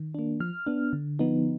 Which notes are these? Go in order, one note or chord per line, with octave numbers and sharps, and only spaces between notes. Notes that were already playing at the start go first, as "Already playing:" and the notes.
Already playing: D#3
A#3 D4
F3 F6
B3 D4
D3
F3 B3 D#4